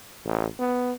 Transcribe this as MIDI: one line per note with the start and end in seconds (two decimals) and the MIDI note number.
0.25 0.46 33
0.59 0.92 59